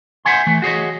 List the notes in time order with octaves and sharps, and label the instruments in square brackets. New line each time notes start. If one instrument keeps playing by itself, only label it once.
[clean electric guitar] C5 E5 F#5 G#5 C6
E3 A3
F#4 G#4 C#5 D#5